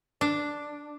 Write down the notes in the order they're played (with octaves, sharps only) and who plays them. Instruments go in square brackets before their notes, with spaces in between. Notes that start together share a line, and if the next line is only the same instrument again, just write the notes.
[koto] D4